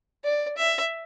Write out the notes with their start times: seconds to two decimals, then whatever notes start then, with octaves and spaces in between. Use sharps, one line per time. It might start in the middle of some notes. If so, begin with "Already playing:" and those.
0.24 D5
0.58 E5